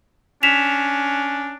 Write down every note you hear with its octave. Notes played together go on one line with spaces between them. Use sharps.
C#4 D4 B6 E7 F7